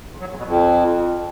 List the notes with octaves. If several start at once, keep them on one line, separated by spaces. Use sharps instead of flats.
E2
F#3
E2
B2
F2